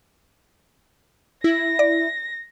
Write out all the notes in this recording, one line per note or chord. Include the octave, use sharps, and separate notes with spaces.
E4 A#6
D5